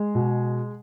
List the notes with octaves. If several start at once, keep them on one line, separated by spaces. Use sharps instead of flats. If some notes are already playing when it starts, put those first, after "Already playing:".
Already playing: G#3
B2